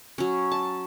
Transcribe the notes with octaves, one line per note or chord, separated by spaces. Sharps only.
F#3 C#4
A5